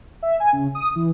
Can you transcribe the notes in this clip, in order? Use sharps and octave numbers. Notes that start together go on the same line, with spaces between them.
E5
G#5
C#3
D#6
E3